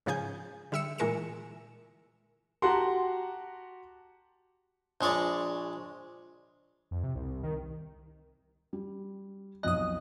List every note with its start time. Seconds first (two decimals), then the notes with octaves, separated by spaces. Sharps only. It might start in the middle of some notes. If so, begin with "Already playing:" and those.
0.06 G#2 C#3 F3 G#4 G#5 G6
0.72 D3 G3 E5 E6 C#7 E7
0.98 A#2 E3 G#3 A#4 C#7 E7
2.62 F#4 G4 F#5 A5 A#5 C6
5.01 A#1 G#3 C#5 D5
6.91 F2
7.03 C3
7.16 C2
7.43 D#3
8.73 G3
9.63 B1 F2 D#5 D#6 F#6